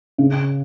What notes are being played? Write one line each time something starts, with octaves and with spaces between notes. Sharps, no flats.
C#3